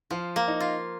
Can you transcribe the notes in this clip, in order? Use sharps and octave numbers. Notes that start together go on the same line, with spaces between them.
F3 F4
A#3
D#4
F4